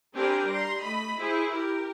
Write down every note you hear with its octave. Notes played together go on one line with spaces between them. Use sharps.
C4 D4 G4 A#4 B4 G#5
G3 A#5 C6
A3 D#5 B5
E4 G#4 C5
G4 A#4